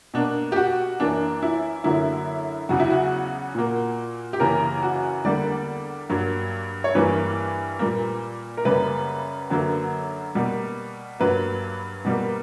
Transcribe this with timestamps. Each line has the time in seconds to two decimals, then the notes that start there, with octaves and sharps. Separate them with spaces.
0.14 B2 A#3 D4
0.52 G4
0.56 F#4
1.00 F#2 E3 A#3 D4
1.42 E4
1.84 F#2 D3 F#3 A#3 E4
2.69 E2 C#3 F#3 F#4
2.80 E4
2.90 F#4
3.55 A#2 A#3
4.33 G4
4.40 F#2 C#3 E3 A#3 A#4
4.83 F#4
5.24 E2 D3 G3 A#3 D5
6.09 G2 F#3 A#3
6.84 C#5
6.95 G2 E3 G3 A#3 B4
7.79 A#2 G3 A#3
8.57 A#4
8.65 F#2 C#3 G3 A#3 B4
9.50 F#2 D3 F#3 A#3
10.35 B2 G3 A#3
11.20 G2 F#3 A#3 B4
12.05 B2 G3 A#3